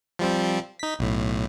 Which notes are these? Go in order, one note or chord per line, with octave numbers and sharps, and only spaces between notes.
F3 G3 C4
D#4 B6
B1 A2